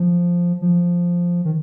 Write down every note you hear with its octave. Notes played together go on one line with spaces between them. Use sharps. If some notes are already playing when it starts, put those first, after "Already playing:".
Already playing: F3
F3
D#3